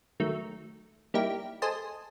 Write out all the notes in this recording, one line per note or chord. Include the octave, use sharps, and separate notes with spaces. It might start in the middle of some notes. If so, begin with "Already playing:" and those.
D#3 F#3 A3
G3 A#3 D#4 E4 G4
G#4 A4 C5 D#5 G#5 A5